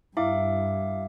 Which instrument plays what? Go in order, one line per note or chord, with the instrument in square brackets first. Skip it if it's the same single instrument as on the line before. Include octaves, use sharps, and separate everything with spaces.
[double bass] G2 [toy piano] E4 [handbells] E5 F5 D6